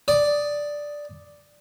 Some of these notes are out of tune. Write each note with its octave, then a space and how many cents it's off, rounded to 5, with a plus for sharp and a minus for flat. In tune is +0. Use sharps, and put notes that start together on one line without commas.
D5 +0 D#6 +0